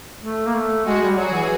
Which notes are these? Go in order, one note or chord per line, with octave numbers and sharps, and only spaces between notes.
A3
A#3
A3
G#3 F#4 G#4
G3
F#3 F#4 G#4
E3